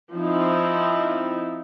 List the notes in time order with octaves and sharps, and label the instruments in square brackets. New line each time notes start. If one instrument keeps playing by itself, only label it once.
[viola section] F3 C4 D#4 E4